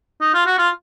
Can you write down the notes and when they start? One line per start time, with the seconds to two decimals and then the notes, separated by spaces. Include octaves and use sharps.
0.21 D#4
0.34 F4
0.46 F#4
0.58 F4